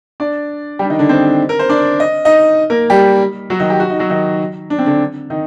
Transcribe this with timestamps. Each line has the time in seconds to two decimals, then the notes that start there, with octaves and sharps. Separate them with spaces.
0.20 D4 D5
0.79 G3 G4
0.84 D4
0.90 D#3 D#4
0.99 D3 D4
1.09 C4 C5
1.49 A#4
1.59 C5
1.69 D4 D5
2.00 D#5
2.25 D#4 D#5
2.70 A#3 A#4
2.90 G3 G4
3.50 F#3 F#4
3.59 D#3 D#4
3.70 G4
3.80 F#4
3.90 D#4
3.99 F#3 F#4
4.10 D#3 D#4
4.70 D4
4.78 C4
4.86 D3 D4
5.30 D#3 D#4